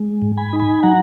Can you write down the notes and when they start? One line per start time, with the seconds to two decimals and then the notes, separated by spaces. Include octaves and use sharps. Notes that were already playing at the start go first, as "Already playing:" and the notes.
Already playing: G#3
0.22 G#2
0.37 G#5 B5
0.53 D#4
0.60 G#5 B5
0.83 F#3 F#5 A#5